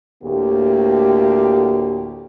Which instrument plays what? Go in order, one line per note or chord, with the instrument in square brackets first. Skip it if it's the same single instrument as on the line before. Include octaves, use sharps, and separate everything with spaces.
[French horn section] D2 A2 A#3 G4